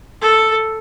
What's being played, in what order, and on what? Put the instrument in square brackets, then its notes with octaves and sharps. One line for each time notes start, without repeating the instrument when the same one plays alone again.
[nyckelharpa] A4